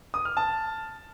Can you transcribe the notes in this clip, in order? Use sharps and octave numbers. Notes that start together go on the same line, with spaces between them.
D#6
F6
A5